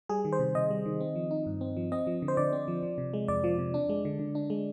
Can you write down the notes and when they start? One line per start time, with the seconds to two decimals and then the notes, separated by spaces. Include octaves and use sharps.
0.09 G3 G#4
0.25 D#3
0.32 C5
0.39 C3
0.55 C3 D#5
0.70 G3
0.86 D#3
1.00 C4
1.16 F3
1.31 D#4
1.46 G2
1.61 C4
1.77 F3
1.92 C4 D#5
2.07 F3
2.22 D3
2.28 C5
2.37 D3 D5
2.53 C4
2.68 F3
2.83 F3
2.98 C3
3.14 G#3
3.28 F2 D5
3.44 F3
3.58 C3
3.74 D4
3.89 G#3
4.05 D3
4.19 D3
4.35 D4
4.50 G#3